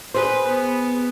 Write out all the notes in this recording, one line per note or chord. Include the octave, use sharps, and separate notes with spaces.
G#4 B4 C5
B3